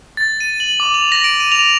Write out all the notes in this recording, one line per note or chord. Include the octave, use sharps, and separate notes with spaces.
A6
D#7
F#7
D6
F7
A#6
D7
D#7
F7